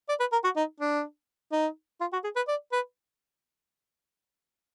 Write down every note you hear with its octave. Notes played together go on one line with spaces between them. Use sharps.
D5
B4
A#4
F#4
D#4
D4
D#4
F4
F#4
G#4
B4
D5
B4